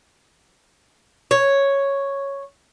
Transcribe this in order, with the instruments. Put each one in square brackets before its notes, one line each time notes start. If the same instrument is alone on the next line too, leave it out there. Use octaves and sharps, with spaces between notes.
[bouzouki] C#5